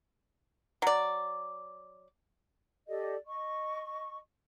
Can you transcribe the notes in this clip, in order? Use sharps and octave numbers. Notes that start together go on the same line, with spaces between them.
F#3 D5
G4 A4 D5 D#5
D#5 C#6